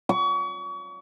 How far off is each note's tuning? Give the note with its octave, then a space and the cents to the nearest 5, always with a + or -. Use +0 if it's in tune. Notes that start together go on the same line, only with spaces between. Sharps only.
C#6 +35